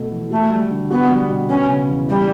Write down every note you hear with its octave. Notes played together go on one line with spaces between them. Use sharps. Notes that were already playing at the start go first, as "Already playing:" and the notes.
Already playing: B2 A3 A4
E3
A3 F#4
G3
D3
B3 F#4
G3
B2
B3 C#4
C#3
E2
G3 E4